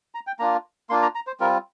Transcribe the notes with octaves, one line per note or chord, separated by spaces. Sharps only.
A#5
G5
A#3 D4 F4 A#5
A#3 D4 F4 C6
A#5
A#5
C5
G3 C4 F4 A#4